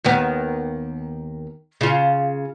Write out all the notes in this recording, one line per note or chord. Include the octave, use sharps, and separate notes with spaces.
D#2 D#3 B3
C#3 F4